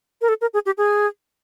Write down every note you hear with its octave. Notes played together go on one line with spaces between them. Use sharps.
A#4
A4
A#4
G#4
G4
G#4